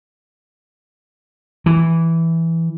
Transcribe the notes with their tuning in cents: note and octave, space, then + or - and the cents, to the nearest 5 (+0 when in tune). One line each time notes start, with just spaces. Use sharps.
E3 +0